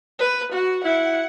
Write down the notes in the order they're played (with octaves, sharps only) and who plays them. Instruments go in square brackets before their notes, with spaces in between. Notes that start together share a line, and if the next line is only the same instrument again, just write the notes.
[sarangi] B4
F#4
[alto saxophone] E4 [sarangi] F#5